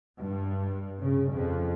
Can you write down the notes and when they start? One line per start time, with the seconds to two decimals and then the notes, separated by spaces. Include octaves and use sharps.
0.19 G2
1.01 C#3
1.32 F2